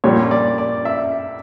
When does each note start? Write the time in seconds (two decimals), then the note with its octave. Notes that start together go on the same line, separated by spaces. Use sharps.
0.04 A#1 A#2 G3 C#5
0.31 D5
0.58 D5
0.85 E5